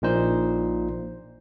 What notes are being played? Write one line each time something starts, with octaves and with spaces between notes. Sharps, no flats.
A#1 A#2 D#4 C5